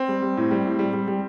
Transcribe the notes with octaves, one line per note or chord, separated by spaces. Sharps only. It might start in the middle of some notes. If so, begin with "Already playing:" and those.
Already playing: C4
G3
G3
A2
G3
A2
G3
G3
G3